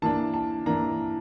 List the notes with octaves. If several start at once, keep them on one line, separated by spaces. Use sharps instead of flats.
E3 A#3 D4 A5
A5
E3 A#3 D4 A#5